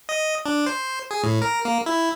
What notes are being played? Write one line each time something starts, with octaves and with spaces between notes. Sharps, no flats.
D#5
D4
C5
G#4
A2
A#4
A#3
E4